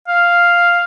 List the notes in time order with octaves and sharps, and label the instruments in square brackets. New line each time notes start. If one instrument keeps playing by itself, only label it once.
[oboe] F5